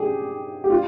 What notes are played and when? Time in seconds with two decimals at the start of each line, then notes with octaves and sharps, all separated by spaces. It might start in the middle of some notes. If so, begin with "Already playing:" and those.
Already playing: G4 G#4
0.64 G4
0.70 F4